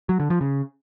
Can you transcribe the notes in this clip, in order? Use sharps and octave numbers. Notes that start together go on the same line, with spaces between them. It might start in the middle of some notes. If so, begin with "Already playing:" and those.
F#3
D3
F3
C#3